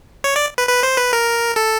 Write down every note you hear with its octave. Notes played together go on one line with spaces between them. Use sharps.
C#5
D5
B4
B4
C5
B4
A#4
A4